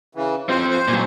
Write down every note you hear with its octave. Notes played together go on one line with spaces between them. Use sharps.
C#3 E3
F3 C4 C5
C5
A#2 F#3